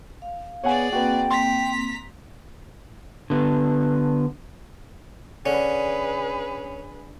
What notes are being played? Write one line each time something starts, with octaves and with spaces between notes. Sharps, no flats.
F5
B3 G#4 C#5 D5 F#5 G#5
A#3 C4 F#4 B4 G5
A#5 C6 B6
D3 B3
D3 C#4 G#4 B4